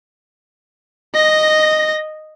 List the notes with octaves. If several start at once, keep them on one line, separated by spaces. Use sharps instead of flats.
D#5 A#6